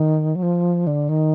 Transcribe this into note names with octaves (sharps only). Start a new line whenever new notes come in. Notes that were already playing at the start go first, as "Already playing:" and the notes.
Already playing: D#3
F#3
F3
D3
D#3